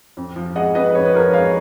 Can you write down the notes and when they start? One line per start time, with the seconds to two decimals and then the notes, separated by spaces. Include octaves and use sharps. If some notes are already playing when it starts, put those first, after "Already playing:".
0.17 F2
0.36 F3
0.56 G#3 D#5 F#5
0.75 F2 B4 D#5
0.95 F2 C#5
1.05 B4
1.14 F3 A#4 C#5
1.34 G#3 C#5 F5